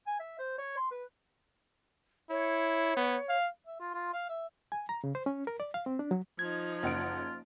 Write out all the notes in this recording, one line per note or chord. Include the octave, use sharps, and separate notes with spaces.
G#5
E5
C5
C#5
C6
B4
E4 C#5
B3
F5
E5
F4
F4
F5
E5
G#5
A#5
C#3
C5
C#4
A#4
D5
F5
C4
D4
F#3
F3 D#4 G#6
F#1 F4 F#5 D7